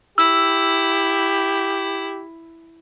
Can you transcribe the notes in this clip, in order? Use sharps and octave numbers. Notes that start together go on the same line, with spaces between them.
E4 G4 E6